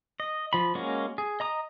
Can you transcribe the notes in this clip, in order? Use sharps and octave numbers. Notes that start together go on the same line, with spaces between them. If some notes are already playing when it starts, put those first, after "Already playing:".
D#5
F3 B5
G#3 A#3 C#4 F#4
G#4
D#5 A#5 D#6